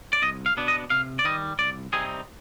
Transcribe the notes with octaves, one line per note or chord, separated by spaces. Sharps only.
D5
C2 D#5
F5
B2 B3 D4
D#5
C3 F5
D5
D#3 G3 D#5
C2 D5
C3 G3 C4 D#4 G#4